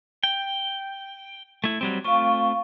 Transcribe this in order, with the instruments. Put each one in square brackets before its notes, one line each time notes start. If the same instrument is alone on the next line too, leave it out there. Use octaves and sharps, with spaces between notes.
[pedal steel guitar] G5
A3 E4
F#3 G3 C4
[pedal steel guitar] A3 C4 F4 [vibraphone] F5 C#6